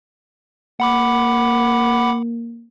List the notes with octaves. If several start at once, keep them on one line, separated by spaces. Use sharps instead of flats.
A#3 F#5 B5 D6